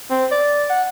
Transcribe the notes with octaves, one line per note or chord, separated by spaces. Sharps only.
C4
D5
F#5